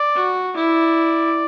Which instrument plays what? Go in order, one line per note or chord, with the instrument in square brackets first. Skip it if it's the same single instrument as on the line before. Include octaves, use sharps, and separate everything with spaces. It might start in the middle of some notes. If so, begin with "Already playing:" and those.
Already playing: [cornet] D5
[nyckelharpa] F#4
[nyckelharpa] E4 [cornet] D5